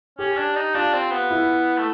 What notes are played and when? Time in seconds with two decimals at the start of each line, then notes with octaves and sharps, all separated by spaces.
0.19 C#4 G4
0.37 D4
0.56 D#4
0.74 D4 F4
0.94 C4
1.11 B3
1.31 E4
1.78 A3